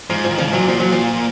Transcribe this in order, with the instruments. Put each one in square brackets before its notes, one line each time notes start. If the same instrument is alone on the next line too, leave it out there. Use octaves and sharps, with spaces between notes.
[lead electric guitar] G#2 [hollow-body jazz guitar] F3
[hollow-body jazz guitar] F3
[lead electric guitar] D#3
[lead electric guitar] C#3 [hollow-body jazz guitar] F3
[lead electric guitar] G#2
[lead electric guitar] A#2 [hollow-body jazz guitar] F#3
[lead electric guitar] A#2 [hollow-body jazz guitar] F3
[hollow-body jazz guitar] F#3
F3